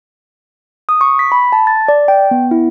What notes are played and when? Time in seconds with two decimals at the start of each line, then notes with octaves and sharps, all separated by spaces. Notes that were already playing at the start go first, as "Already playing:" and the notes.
0.89 D#6
1.01 C#6
1.19 B6
1.32 B5
1.52 A5
1.67 A6
1.88 D5
2.08 G5
2.31 B3
2.51 E4